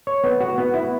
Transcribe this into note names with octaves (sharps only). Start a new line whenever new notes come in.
C#5
B3
F#4
B3
E4